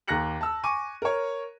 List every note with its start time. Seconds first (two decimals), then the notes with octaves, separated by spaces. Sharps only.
0.08 D#2 A#5 F#6 A#6 C#7 F#7
0.41 A5 E6
0.64 G#5 C#6 D6 D#7
1.02 A#4 C#5